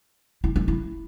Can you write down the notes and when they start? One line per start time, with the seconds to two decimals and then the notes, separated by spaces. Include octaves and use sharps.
0.44 E4
0.56 D4
0.68 E4